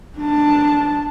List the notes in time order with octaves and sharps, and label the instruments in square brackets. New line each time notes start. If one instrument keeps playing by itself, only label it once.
[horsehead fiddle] D4 A5